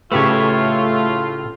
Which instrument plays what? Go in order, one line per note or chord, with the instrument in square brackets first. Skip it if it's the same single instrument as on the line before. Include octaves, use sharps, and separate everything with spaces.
[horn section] A2 F4 [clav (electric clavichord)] C#3 G4 B4 [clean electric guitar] A3 C#5